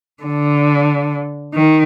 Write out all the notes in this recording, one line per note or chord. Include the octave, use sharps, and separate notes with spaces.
D3
D#3